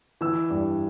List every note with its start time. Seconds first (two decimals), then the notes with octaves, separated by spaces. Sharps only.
0.21 E3 E6
0.51 G2